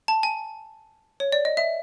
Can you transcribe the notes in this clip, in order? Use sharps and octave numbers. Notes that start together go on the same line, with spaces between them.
A5
G#5
C#5
D5
D#5
E5